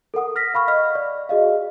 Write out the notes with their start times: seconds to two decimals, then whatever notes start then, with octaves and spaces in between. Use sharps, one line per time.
0.14 A4 A#4 F#5 D#6
0.36 F6 A#6 B6
0.54 F5 B5 C#6 F6
0.68 D#5 F6
0.95 D5
1.29 F#4 G#4 D#5 F5